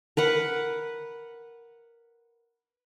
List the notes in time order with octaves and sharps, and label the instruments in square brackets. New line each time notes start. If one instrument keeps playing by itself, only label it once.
[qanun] A#4 B4 F#5